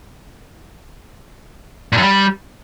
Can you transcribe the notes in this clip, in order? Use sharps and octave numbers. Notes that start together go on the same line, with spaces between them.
A#2
F#2
G3